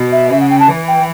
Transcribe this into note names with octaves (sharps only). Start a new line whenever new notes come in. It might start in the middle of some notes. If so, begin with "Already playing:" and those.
Already playing: B2
E5
C#3 E5
F#5
G5
A5
E3
G5